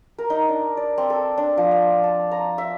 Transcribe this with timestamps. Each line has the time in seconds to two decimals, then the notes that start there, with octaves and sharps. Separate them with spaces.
0.18 A#4
0.30 D#4
0.49 D4
0.77 D5
0.98 C4
1.10 A4
1.38 D4
1.57 F3
1.71 F5
2.04 A5
2.31 A#5
2.58 E5